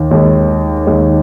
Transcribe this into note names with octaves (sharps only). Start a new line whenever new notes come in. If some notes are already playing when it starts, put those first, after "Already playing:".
Already playing: D#2 D#3
D#2 D#3 G#3
D#2 D#3 G#3